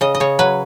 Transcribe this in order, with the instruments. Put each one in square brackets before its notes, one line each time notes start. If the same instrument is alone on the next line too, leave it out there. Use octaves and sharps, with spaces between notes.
[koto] C#3 D#5
D#5
C#3 C#5
F#3 B4